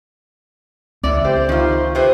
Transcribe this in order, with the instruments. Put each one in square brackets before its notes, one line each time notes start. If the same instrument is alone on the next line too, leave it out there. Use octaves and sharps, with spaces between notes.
[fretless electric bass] C#2 C4 [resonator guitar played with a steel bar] D3 E3 [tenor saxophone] D5
[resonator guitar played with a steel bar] G4 [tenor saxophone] C5
[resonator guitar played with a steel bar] D#3 F4
[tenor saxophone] C3 [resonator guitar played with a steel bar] B4 C5